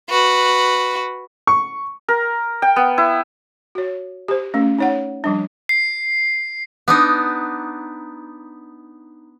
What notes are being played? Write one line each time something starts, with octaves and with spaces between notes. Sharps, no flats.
F#4 B4
C#6
A#4
G5
B3
E4
F#4 C#5
G4 C5
A3 C#4
D#4 C#5 F#5
F3 G3 D4
C7
B3 D4 D#4